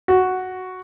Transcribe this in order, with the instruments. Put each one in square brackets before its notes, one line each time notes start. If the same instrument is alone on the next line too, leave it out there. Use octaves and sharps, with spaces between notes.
[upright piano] F#4